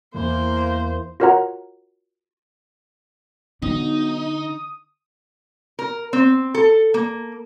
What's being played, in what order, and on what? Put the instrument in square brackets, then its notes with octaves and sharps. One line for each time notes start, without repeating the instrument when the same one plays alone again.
[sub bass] E2 [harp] E3 [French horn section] A#3 [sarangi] C5
[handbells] F4 F#4 A#4 C#5 F#5 A#5
[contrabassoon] B1 [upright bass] D3 [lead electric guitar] D#4 [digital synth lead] D#6
[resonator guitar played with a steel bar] A#4
C4
A4
A#3